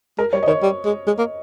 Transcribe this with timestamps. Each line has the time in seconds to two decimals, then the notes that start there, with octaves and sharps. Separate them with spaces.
0.18 G#3 A#4
0.33 G3 C#5
0.43 D#5
0.47 D#3 C#5
0.62 G3
0.85 G#3
1.07 G#3
1.19 A#3